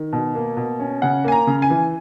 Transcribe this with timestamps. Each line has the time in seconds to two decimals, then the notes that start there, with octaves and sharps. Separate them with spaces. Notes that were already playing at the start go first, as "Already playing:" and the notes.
Already playing: D#3
0.13 B2
0.35 A#3
0.57 B2
0.80 C#4
1.02 C#3 F#5
1.24 A#3 G#5
1.32 A#5
1.47 C#3
1.62 G#5
1.70 E3